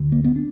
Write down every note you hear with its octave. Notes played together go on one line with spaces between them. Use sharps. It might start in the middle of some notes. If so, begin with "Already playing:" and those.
Already playing: D2 D3
A#3
B3
D4